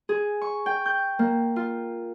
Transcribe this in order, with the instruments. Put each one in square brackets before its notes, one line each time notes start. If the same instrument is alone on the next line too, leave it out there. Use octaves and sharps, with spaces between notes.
[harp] G#4
C#6
G5
G6
A#3
F4